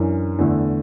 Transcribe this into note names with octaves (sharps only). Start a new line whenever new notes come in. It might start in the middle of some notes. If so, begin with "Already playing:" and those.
Already playing: F#2 E3 D4
E2 D3 A3 E4